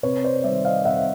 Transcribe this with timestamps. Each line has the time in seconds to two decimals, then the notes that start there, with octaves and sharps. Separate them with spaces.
0.03 C3 B4 C#5
0.24 C5 D5
0.44 D#3 G3 D5 E5
0.65 D#5 F5
0.85 C3 E5 F#5